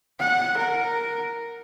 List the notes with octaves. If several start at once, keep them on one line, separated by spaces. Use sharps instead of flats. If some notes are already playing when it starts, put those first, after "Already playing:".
F#5
A#4